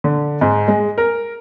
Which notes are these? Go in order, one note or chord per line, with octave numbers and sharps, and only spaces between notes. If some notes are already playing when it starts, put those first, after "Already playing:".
D3
G#2
G#3
A#4